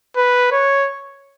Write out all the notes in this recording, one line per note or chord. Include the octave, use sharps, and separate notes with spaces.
B4
C#5